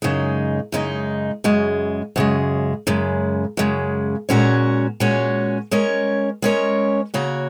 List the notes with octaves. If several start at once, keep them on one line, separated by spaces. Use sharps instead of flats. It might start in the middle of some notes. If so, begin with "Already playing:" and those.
F#2 C#3 G#3 D#4
F#2 C#3 G#3 D#4
F#2 C#3 G#3
F#2 C#3 G#3
F#2 C#3 G#3
F#2 C#3 G#3
A#2 G#3 C#4 F#4 C#5
A#2 G#3 C#4 F#4 C#5
G#3 C#4 A#4 C#5
G#3 C#4 A#4 C#5
C#3 A#3 F#4 C#5